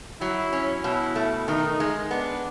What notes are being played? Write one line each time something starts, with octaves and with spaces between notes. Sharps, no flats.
F#3 E4
C#4
B2 E4
A3
D#3 D#4
G#3
B3 D4